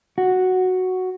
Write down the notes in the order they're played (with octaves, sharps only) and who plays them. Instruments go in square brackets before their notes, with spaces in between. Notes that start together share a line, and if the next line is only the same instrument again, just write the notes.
[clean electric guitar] F#4